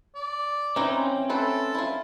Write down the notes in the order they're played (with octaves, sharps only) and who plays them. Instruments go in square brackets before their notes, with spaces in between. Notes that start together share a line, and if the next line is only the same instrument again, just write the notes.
[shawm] D5
[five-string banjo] E3 D#4 [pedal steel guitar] C4 C#4
[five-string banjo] A3 B4 C5 [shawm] A4
[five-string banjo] E4 F4